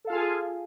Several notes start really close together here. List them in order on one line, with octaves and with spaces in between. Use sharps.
A4 F5 F4 G#5 G#4